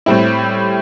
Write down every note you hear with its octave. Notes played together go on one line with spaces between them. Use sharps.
A2 G3 C4 E4